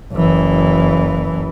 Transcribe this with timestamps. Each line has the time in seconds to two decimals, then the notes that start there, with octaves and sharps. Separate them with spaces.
0.13 F#1 E3